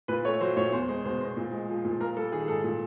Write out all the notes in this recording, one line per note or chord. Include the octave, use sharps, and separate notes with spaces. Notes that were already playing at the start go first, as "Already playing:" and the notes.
A#2 B4
A3 C#5
F#3 C5
A#2 C#5
E2 C5
G#3 C5
B2 C5
E2 C5
A#2
G#3
F3
A#2
A#3 A#4
G3 A4
D#3 G#4
G#2 A4
A#2